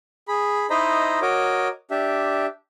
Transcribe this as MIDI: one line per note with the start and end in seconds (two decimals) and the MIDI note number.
0.28 0.66 68
0.28 0.66 83
0.70 1.20 63
0.70 1.20 64
0.70 1.20 72
0.70 1.20 75
0.70 1.20 82
0.70 1.20 83
1.22 1.68 66
1.22 1.68 70
1.22 1.68 73
1.22 1.68 75
1.22 1.68 86
1.91 2.46 62
1.91 2.46 67
1.91 2.46 76